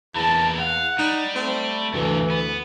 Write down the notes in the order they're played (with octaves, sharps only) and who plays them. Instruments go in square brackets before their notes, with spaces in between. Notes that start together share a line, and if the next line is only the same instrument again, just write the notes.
[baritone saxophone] E2 [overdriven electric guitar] E3 A#3 [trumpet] A5
[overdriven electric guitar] F5 [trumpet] F#5
[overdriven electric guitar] G3 [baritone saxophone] D#4
[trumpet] A3 [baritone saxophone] C4
[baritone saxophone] D2 [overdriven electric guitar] G2 C3 [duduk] E3
[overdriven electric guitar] B3